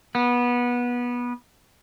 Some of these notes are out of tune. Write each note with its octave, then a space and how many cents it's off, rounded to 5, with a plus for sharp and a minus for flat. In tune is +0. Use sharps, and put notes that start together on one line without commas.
B3 -20